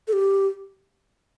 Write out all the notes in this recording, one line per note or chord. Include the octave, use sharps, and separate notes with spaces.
A4
G4